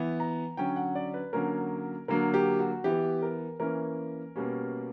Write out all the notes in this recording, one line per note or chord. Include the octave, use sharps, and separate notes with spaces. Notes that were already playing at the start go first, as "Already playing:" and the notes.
Already playing: E3 B3
A#5
D3 F#3 C#4 G5
F#5
D5
B4
D3 F#3 A#3 C#4 A#4
D3 F#3 A#3 A#4
G4
F#4
E3 B3 G4
A#4
E3 A#3 C#4 A#4
B2 G3 A#3 C#4